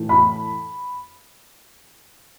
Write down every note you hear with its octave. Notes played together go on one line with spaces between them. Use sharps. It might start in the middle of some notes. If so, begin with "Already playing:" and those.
Already playing: A2 E3 A3
B5